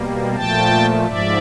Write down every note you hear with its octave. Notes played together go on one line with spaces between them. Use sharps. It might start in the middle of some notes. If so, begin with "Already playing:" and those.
Already playing: B2 G3 A#3
A#2 F3 A3 G5 A5
G#2 F3 D5 E5